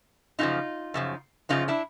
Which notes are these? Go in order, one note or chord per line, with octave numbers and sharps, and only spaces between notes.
F#2 C#3 F3 D#4 F4
F#2 C#3 F3
F#2 C#3 F3 D#4 F4
D4 E4